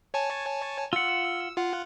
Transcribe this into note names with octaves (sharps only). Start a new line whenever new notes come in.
C#5 G#5 A5
F4 F#5 E6
F4 F#5